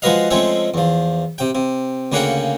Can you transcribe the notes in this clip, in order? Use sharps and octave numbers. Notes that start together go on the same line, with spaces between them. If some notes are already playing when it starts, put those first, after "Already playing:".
F3 G#3 F#4 B4 D#5 F5
F3 G#3 A3 C4 C#4
E2 F3
C3 G5
C3
D2 C#3 A#3 C#4 F#5 G5